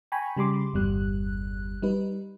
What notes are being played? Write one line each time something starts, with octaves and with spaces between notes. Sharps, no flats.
G5 G#5 A#5 B5 C#6
C#3 G3 B5 C6 D6
G1 E2 G3 F#6
G3 D#4 B4